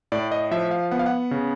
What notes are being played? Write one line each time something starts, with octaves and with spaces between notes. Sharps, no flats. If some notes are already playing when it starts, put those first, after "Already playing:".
A2 D5
D#5
F3 E5
F5
B3 F#5
F5
F#5
C#3